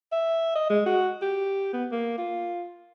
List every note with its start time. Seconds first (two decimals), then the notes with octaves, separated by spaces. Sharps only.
0.12 E5
0.56 D#5
0.70 G#3
0.86 F#4
1.22 G4
1.73 B3
1.92 A#3
2.18 F4